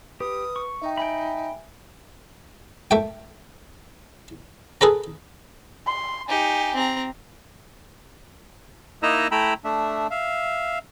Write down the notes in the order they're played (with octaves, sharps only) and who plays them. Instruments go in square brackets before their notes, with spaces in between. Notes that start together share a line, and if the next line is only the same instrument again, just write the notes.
[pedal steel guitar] G4 [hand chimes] B4 [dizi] D#6
[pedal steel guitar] C#6
[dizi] D#4 [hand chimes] E5 G5
[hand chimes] E5 G#5 [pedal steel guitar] G5 B5
[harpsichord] A3 G5
G#4 A4 B4 A#5
[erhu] C6
[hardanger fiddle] D#4 G4 [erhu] G#5
[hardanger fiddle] C4 A#5
[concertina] A#3 D#4 E4 D#5 A#5 E6
A3 E4 G5 A#5 B5 E6
A3 D4 E5
E5 F5